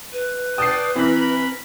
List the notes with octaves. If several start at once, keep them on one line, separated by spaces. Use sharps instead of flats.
B4
D5 G5 A5 D#6 C7
E3 C4 A#4 B5